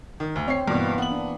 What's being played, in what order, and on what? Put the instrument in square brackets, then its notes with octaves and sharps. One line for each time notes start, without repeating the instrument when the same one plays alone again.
[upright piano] D#3
D2
[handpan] C4 [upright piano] C#5 C7
[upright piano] G2 B2 [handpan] E3 A#3
[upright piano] B3 F#7
[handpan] D4